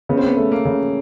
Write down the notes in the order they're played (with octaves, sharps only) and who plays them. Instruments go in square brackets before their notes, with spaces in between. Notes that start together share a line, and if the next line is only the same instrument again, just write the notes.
[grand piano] C#3 [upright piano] B3
[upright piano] C4
B3
[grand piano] A3
[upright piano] A#3
[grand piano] C#3